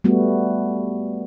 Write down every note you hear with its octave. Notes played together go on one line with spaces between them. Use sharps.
G3 A3 B3 F#4